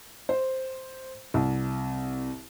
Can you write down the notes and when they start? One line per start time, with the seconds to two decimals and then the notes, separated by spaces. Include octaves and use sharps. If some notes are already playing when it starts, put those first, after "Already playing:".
0.29 C5
1.34 C2